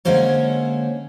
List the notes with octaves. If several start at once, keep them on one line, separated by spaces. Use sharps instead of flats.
D3 G#3 A#3 C#4 C5 C#5